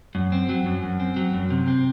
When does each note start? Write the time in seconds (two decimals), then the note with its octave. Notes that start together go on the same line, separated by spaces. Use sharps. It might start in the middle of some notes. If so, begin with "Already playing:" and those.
0.15 F#2
0.32 C4
0.49 F#3
0.66 F#2
0.83 F#2
1.00 C4
1.16 F#3
1.34 F#2
1.50 C3
1.68 C4